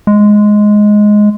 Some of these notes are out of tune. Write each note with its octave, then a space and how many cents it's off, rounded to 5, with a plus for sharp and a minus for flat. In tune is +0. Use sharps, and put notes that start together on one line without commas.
G#3 +5